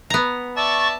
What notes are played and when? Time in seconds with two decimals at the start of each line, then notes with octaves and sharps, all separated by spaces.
0.10 B3 A#5
0.57 D5 E5 A5 C#6 A6